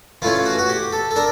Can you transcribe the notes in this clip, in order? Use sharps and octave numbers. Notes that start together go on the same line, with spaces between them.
E3 A3 C#4 F4
F#4
F#4
G4
A4
A4
D4 A#4